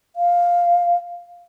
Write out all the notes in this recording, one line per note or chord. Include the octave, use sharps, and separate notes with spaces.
F5